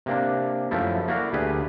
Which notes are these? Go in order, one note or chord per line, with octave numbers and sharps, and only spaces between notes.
C3 A#3 D4
F#2 F3 A3 E4
A#3 E4 F#4 D5 F5
D2 G4 G#4 B4